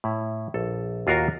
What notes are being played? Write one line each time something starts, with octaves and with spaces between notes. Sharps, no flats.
A2 E4
A#1 A4
D#2 F4 F#4 A#4 F5 A#5